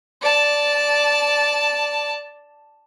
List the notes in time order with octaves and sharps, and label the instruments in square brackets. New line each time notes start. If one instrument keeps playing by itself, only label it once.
[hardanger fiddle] D5 A5